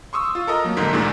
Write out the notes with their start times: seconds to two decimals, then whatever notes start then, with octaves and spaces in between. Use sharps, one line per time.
0.13 C6 C#6 D#6 E6
0.35 F4
0.47 A4 A#4 D#5 A#5
0.64 F#3 A#3
0.77 A#1 G#2 D3 D#4 A#4 B6
0.93 D2 A#2 D#3 G#3 D4 D6